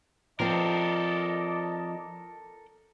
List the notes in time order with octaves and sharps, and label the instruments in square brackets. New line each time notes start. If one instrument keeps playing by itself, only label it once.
[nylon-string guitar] F3 C4 [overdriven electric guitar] A4 A#4 [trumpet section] D5 D#5